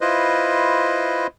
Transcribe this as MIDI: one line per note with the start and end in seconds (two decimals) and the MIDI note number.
0.01 1.27 64
0.01 1.27 65
0.01 1.27 71
0.01 1.27 72
0.01 1.27 75